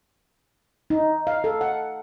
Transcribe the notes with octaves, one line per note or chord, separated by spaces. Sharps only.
D#4
F5
A4
F#5